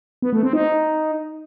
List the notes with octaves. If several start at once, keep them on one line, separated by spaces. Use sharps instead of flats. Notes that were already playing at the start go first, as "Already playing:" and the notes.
B3
A3
C4
D#4